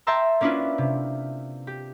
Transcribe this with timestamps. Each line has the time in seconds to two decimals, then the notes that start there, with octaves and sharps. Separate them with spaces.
0.07 E5 G5 A5 A#5 C6 E6
0.41 A#3 C#4 D4 E4 F4 B4
0.78 C3
1.67 G4